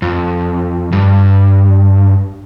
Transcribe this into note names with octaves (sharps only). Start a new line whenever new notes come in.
F2
G2